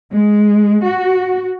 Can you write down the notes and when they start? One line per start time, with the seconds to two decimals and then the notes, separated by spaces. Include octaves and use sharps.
0.11 G#3
0.83 F#4